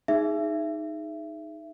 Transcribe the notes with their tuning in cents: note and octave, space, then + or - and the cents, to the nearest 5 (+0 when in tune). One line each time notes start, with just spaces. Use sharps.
D#4 +0 G#4 +0 E5 +25